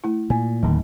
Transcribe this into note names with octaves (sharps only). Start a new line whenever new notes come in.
A3 E4
A#2 G#5
D1 D#2 D#3 G3